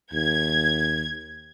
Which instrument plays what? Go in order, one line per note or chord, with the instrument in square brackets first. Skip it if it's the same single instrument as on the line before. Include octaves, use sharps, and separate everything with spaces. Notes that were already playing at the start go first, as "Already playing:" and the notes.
[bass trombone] D#2 [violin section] G#6